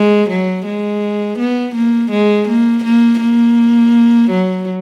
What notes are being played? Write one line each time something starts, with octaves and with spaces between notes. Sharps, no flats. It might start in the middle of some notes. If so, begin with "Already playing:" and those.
Already playing: G#3
F#3
G#3
B3
A#3
G#3
A#3
A#3
A#3
F#3